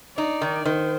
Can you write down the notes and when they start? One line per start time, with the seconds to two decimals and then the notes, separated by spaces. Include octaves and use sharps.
0.17 D#4 D5
0.42 D#3
0.65 D#3 C5